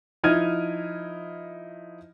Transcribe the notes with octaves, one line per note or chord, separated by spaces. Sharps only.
F3 D#4 E4 F6 G#6 D#7